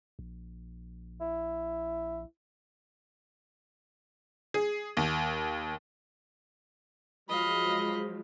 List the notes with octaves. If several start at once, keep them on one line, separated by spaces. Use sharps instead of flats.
A#1
E4
G#4
D#2
F3 F#3 G#3 D#5 F5 B5